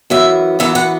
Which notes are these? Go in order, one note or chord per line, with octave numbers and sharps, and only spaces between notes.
F#2 E3 B3 E5
F#2 E3 B3 E5
F#5